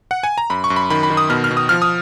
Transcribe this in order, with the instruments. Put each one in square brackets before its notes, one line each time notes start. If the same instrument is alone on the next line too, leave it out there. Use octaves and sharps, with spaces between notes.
[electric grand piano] F#5
G#5
A#5
F#2 B5
C#6
F#2
B5
D#3 B5
B5
D#3
D#6
B2 F6
F6
B2
D#6
F3 F6
D#6